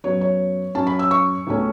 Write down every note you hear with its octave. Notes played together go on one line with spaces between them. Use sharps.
F#2 F#3 B3 C#5
C#5
F#2 F#3 C#4 A5
B5
E6
C#6
C#2 B2 A3 C#4